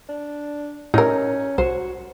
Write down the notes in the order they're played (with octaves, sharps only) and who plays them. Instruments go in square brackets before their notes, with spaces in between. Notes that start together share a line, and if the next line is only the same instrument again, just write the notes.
[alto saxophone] D4
[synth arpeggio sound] A2 E6 [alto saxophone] C#4 [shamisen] D#4 A#4
[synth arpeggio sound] C2 [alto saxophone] F#4 [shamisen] C5